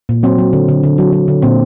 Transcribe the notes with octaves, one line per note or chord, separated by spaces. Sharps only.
A#2
F#3 C4
F#3
D3
D3
D3
F#3
F#3
D3
A#2 C4